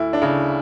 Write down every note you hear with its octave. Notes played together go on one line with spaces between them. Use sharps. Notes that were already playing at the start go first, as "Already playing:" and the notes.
Already playing: D2 E4
D4
C#3 E4